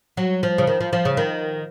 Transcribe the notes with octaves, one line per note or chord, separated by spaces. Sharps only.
F#3
F3
C#3
D#3
F3
F3
C#3
D#3